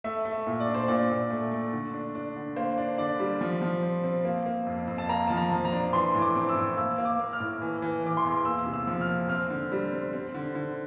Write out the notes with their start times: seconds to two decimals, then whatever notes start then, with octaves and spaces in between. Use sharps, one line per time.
0.04 A3 E5
0.25 A3
0.33 E5
0.47 A#2
0.60 D5
0.67 D4
0.74 C5
0.88 A#2 D5
1.09 A#2
1.30 A3
1.52 A3
1.73 D3
1.94 D4
2.15 D4
2.36 D3
2.56 A#3 C5
2.78 D4
2.98 D3 D5
3.20 G3
3.41 F3
3.62 F3
3.83 C4
4.04 C4
4.25 A#3
4.46 A#3
4.66 F2
4.87 F2
4.98 A5
5.09 A#3 A#5
5.28 F3 A5
5.37 A#5
5.51 F3
5.65 A#5
5.72 D4
5.93 E3 C6
6.14 A2
6.22 D6
6.35 C4
6.49 E6
6.56 A2
6.77 A#3 E6
6.98 A#3
7.05 D6
7.19 A#3
7.33 F6
7.40 A2
7.62 E3
7.82 E3
8.03 E3 D6
8.17 C6
8.24 E2
8.45 A#3 E6
8.66 C3
8.74 E6
8.87 F3
9.01 F6
9.09 A#3
9.29 C4 F6
9.50 D3
9.72 G3
9.92 C4
10.13 C4
10.34 D3
10.55 D3